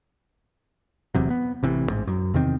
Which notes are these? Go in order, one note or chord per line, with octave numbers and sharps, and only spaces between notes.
D1 E2 C3 F#3
B3
A1 C3 E3
A1 G#2
F#2
E2 C3 D#3 C4